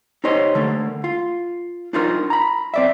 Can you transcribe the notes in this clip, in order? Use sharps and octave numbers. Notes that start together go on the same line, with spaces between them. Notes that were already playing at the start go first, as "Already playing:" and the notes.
D#4 G4 C5 C#5 D#5
D3 A3 A#3
F4
D4 D#4 F4 A#4
A#5 B5
C4 D5 E5